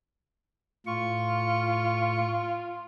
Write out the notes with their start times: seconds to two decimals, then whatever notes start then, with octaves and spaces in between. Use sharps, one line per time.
0.86 A2 F4 C#6